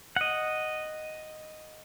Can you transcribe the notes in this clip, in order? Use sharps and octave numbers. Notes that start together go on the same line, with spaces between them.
D#5 F#5